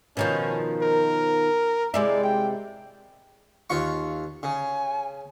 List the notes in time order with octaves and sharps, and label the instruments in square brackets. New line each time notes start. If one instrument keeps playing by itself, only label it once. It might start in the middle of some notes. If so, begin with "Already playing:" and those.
[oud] B2 D#3 F3 [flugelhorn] C#4
[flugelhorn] A#4
[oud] C3 G#3 E4 [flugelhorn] D5
[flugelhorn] G5
[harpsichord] D#2 F4 C#6
[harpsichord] C#3 [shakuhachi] G#5